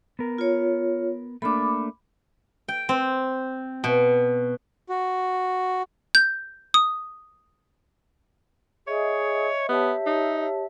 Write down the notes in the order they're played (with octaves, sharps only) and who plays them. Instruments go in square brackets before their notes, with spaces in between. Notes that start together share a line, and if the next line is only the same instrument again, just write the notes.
[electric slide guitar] B3 A#4
[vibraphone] F4 C#5
[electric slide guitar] A3 A#3 D4 [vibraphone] B5 D6
[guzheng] G5
C4
B2
[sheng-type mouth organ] F#4
[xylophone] G6
D#6
[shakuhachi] G#4 [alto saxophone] C#5 [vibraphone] D#5 E5
[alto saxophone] B3 [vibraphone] G4 C#5 A5 [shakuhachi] E5
[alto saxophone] D#4